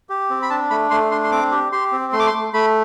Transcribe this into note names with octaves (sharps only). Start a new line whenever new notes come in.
G4
C4
B5
D4 A5
A3 B5
A3 C6
D4 C6
C6
C4 D6
G4
G4 C6
C4
A3 C6
D6
C6
A3
A3 B5